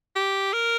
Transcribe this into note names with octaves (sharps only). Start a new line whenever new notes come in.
G4
A#4